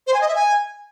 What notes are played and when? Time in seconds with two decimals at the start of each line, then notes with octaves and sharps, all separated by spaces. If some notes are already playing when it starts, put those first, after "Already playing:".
0.07 C5
0.14 G#5
0.21 D#5
0.28 E5
0.35 G#5